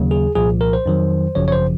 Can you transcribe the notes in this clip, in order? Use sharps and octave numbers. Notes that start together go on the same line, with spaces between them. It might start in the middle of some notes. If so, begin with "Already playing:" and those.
Already playing: D#2 C#3 F#3
G#4
C2 A#2 F3 G#4
A#4
C5
F2 D#3 F#3
G#1 F#2 C#3 F3 C#5
C#5
C5